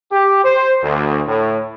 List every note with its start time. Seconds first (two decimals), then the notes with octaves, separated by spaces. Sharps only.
0.12 G4
0.45 C5
0.83 D2
1.27 A2